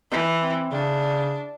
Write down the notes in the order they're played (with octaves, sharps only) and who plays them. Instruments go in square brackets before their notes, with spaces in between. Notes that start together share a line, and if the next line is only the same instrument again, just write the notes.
[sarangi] E3
[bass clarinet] C4
[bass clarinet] C#3 [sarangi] D4